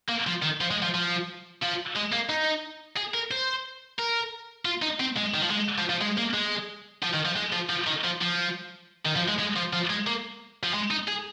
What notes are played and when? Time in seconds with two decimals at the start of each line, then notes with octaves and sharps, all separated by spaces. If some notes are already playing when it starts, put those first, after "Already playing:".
0.09 A#3
0.27 F3
0.43 D#3
0.61 F3
0.71 G#3
0.82 F3
0.94 F3
1.62 F3
1.96 G#3
2.12 A#3
2.29 D#4
2.97 G#4
3.14 A#4
3.31 C5
3.99 A#4
4.65 F4
4.82 D#4
5.00 C4
5.17 G#3
5.34 D#3
5.42 F3
5.51 G#3
5.78 F3
5.90 F3
6.01 G#3
6.18 A#3
6.34 G#3
7.03 F3
7.13 D#3
7.25 F3
7.36 G#3
7.52 F3
7.69 F3
7.87 D#3
8.04 F3
8.21 F3
9.05 D#3
9.16 F3
9.28 G#3
9.39 G#3
9.56 F3
9.73 F3
9.90 G#3
10.07 A#3
10.63 F3
10.74 G#3
10.91 D#4
11.08 G#4